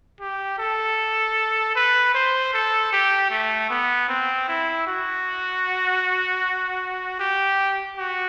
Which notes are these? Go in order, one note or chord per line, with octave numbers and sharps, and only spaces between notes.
G4
A4
B4
C5
A4
G4
A3
B3
C4
E4
F#4
G4
F#4